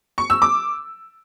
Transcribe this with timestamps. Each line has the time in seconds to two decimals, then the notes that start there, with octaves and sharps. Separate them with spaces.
0.18 C#6
0.30 E6
0.42 D6